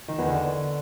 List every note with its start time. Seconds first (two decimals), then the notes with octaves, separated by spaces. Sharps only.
0.08 D#3
0.18 E2
0.28 D3